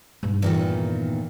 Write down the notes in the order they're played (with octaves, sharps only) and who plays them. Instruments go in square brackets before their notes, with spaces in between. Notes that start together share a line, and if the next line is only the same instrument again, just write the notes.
[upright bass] G2 D#4
[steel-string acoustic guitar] E2 A#2 D#3